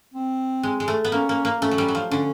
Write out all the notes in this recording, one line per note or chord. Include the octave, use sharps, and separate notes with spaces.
C4
G#3
G#3
A3
B3
A#3 C#4
A#3
A#3
A3 C#4
F#3
G3
F#3
F3
D3 C#4